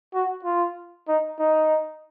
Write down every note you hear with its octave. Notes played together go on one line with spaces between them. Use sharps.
F#4
F4
D#4
D#4